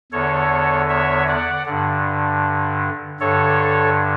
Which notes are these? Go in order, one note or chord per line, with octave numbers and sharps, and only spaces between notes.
E2 D3 A4 C#5
C#5 E5
D5 F#5
G2 D3
G2 D3 A4 C#5